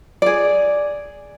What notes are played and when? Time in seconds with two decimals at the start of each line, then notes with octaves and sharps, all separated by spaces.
0.22 G#4 D5